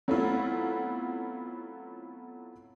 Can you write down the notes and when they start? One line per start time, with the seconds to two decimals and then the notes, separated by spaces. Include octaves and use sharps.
0.08 F#3 A3 B3 C4 E4 F4